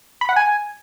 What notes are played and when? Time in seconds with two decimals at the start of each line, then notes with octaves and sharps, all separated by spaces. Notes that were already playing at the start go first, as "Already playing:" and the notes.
0.21 B5
0.29 F#5
0.36 G#5